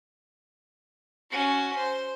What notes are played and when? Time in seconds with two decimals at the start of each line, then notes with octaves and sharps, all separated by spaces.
1.31 C#4 F#4
1.76 C5